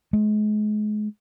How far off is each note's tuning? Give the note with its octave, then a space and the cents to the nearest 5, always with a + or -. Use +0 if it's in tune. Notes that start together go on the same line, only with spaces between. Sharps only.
G#3 +35